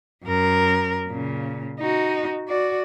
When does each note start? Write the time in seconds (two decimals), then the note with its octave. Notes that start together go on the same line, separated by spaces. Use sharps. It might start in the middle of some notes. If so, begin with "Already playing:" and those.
0.24 F#2 A#4
1.08 A#2 C#3
1.80 D#4 F#4
2.48 F#4 D5